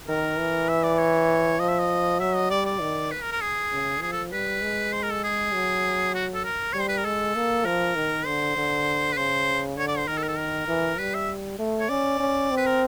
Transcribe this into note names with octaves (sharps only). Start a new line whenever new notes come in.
D#3 A#4
E3
E5
D5
C#5
F3 D#5
E5
D#5
F#3 E5
D#5
G3 D5
D5
D#3
B4
A#4
A#4
G#4
C#3
F3 G#4
A4
G3 B4
G#3
C5
A#4
A4
G#4
F#3
F#4
A4
A#4
G3 C#5
C5
B4
A#4
G#3 A4
A#3
F3 A#4
D#3
D3 C5
D3
B4
C#3 C5
D3 C#5
D5
C5
D#3 A#4
A4
A#4
A4
A#4
E3
G3 B4
E5
A3
C#5
C#4 D5
C#4
C4
B4
A#4